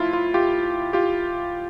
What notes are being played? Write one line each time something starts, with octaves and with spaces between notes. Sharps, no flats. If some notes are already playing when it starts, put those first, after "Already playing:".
Already playing: A2 F3 E4 F4
F4
F4 G4
F4 G4